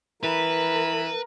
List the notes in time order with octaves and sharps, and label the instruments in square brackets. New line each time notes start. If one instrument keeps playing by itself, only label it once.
[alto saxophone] E3 [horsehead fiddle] A#4 [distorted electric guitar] B4